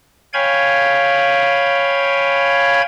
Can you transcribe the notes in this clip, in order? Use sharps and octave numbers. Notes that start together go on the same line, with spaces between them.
C#5 F5 G5 G#5 B5 G#6